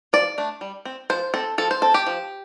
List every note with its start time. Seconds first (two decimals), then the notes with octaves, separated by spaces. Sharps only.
0.13 F3 D5
0.38 A3 D4
0.61 G3
0.85 C4
1.10 F3 C5
1.34 C4 A4
1.58 F3 A4
1.71 C5
1.82 C4 A4
1.94 G4
2.07 F3